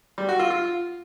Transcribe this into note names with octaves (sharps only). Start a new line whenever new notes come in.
G3
F#4
F4
F4